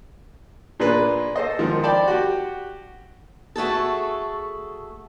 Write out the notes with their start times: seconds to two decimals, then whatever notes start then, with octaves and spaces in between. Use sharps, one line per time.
0.80 A#2 D4 G#4 B4
1.36 A4 C5 D#5
1.59 G#2 D#3 F3
1.83 D5 G5 A5 B5
2.08 F#4 G4
3.56 A3 F#4 G#4 A4